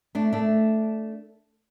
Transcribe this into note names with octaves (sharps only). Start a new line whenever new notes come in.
A3 D4
A3 D4